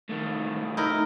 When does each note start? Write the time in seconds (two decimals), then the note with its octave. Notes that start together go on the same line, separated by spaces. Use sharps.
0.09 A2 D#3
0.77 D#4 E4 A#4